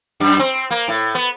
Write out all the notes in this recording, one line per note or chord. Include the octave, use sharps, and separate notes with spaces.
F#2
C4
A#3
A2
B3